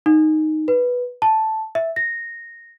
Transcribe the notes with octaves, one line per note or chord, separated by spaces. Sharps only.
D#4
B4
A5
E5
A#6